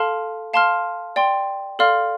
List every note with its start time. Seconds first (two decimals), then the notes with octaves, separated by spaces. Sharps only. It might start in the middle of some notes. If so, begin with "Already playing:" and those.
Already playing: A4 F5 A5 C6 F6
0.54 F5 A5 C6 F6
1.16 D5 G5 C6
1.79 A4 D5 F5 C6 F6